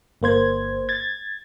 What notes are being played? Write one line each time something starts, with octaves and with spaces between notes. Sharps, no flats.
G1 A#3 C5 G#6
G#6 A6